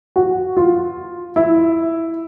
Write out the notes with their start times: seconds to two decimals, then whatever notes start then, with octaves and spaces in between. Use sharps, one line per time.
0.16 F#4
0.57 F4
1.36 E4